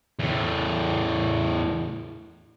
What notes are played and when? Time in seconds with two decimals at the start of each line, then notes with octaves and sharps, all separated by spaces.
0.19 E2 A2